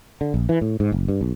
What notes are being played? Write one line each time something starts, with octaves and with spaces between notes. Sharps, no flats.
D3
A#1
E3
A2
G#2
F#1
G2
B1